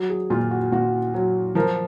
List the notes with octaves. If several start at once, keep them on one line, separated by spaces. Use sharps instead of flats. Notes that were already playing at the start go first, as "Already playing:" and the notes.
Already playing: F#3
G#4
A#2 F4
F#4
A#2 F#4
F#3
F3 A#4